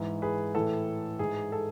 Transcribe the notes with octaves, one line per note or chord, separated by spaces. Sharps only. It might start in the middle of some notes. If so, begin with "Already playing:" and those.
Already playing: G#2 E3
G#4 B4
A2 E3 A4
G#2 E3 G#4
A4